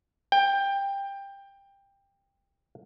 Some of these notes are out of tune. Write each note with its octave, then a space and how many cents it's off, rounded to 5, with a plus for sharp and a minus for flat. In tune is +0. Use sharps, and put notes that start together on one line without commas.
G5 +15